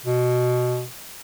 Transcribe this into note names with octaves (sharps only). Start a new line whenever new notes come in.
B2